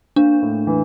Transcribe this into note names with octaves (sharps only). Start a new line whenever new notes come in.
A#3 D4
A2
E3